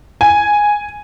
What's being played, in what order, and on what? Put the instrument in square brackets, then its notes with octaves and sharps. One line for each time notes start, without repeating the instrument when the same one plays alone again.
[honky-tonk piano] G#5